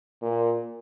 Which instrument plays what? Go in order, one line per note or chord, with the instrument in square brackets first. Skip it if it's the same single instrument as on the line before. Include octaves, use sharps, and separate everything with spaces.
[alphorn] A#2